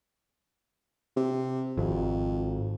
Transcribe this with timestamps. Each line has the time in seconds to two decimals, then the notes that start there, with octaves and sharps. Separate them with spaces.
1.16 C3
1.78 G#1 F2